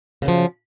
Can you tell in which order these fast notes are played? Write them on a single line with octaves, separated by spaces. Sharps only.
C#3 F#2 F3